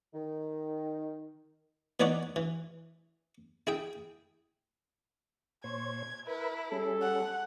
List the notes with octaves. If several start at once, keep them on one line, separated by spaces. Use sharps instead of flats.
D#3
E3 B3 D#4 C#5 D5 F#5
E3
E4 G#4 G5
A#2 C5 C#5 G#6
E4 A#4 B4
G3 C#4 G#4 A4
F#5